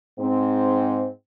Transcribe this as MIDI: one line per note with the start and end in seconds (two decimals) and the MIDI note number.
0.19 1.06 44
0.19 1.06 60